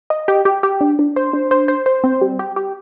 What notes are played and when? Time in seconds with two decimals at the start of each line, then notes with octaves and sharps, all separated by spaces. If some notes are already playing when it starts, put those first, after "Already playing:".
0.10 D#5
0.28 G4
0.45 G4
0.63 G4
0.81 D4
0.99 D4
1.16 C5
1.33 D4
1.51 C5
1.68 C5
1.86 C5
2.04 C4
2.21 G3
2.39 G4
2.56 G4